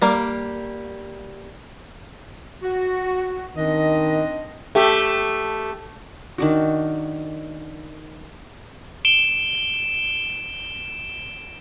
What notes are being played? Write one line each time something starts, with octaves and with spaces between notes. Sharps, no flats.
G3 A#3
F#4
D#3 C4 D4 D#5
A3 G4
D#3 D4 F#4
D7 E7 G7